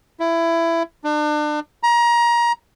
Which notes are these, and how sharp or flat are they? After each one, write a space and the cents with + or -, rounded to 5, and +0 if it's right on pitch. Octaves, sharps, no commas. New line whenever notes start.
E4 +15
D4 +35
A#5 +25